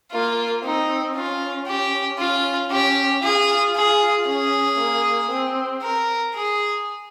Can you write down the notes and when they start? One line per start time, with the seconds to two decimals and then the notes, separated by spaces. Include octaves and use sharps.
0.13 A#3 F4
0.64 C4 D#4
1.16 C#4 F4
1.68 G4
2.19 C#4 F4
2.71 C#4 G4
3.24 F4 G#4
3.76 G#4
4.27 C#4 G#4
4.79 A#3
5.31 C4
5.83 A#4
6.35 G#4